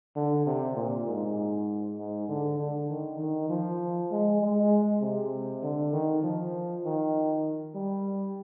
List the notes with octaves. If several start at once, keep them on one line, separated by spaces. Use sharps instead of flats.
D3
C3
A#2
G#2
G#2
D3
D3
D#3
D#3
F3
G#3
G#3
C3
D3
D#3
F3
D#3
G3